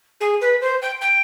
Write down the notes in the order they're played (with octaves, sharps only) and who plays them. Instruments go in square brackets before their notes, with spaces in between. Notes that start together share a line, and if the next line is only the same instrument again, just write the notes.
[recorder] G#4
B4
C5
G5
G5